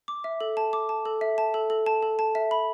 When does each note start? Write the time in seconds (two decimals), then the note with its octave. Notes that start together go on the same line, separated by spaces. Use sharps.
0.08 D6
0.24 E5
0.40 A4
0.57 A5
0.73 D6
0.89 A5
1.05 A4
1.21 E5
1.38 A5
1.54 A4
1.70 A4
1.86 A5
2.03 A4
2.19 A5
2.35 E5
2.51 B5